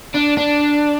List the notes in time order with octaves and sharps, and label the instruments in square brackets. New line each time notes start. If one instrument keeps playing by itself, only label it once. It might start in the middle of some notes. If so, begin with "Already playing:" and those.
[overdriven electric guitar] D4
D4